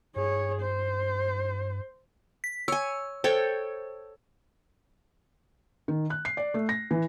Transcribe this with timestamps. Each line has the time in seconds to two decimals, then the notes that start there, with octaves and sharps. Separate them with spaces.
0.16 G2 G#4 C#5
0.61 C5
2.44 B6
2.68 C#5 G#5 E6
3.24 A4 C5 C#5 G5
5.88 D#3
6.10 F#6
6.25 C7
6.37 D5
6.54 A3
6.69 A#6
6.91 E3